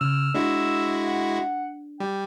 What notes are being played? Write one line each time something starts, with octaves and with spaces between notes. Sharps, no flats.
C#3 E6 F6
G#3 D4 E4 F#4
F#5
G3 G5